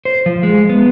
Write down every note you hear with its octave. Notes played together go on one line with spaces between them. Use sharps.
C5
F3
G#3
B3